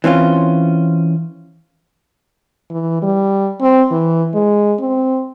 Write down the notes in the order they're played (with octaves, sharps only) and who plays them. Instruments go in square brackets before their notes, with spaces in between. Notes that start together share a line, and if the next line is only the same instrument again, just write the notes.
[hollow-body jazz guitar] E3 C4 C#4 F4
[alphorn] E3
G3
C4
E3
G#3
C4